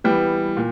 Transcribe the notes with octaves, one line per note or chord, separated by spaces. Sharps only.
E3 G3 B3 G5
A#2